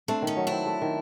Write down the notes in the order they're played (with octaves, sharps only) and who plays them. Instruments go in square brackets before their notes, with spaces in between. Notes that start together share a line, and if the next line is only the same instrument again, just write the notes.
[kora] A3 [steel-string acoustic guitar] C4 D4
[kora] D#3
[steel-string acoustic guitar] C#4 D#4
[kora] F#3
[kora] C4 [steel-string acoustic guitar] D4 E4
[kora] A3
D#3